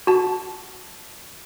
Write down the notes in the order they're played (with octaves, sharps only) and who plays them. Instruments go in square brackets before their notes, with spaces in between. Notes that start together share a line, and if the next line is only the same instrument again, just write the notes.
[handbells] F#4 A5